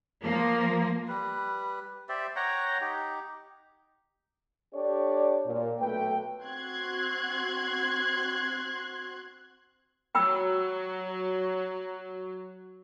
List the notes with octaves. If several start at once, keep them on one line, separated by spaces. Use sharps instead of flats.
F3 A#3
G3 B4
G4 C5 D5 E5
C#5 F#5 G5 A#5
D#4 G4
D4 G4 A4 C#5 D5
A#2
B1 A3 B4 G5
C4 F#4 C6 F#6 G#6
F#3 G5 B5 E6